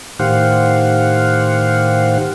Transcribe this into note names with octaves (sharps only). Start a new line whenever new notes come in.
A2 D#3 G4 C5 F5 F#5